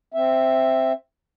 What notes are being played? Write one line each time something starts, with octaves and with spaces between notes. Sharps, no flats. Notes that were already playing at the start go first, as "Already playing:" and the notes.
C4 E5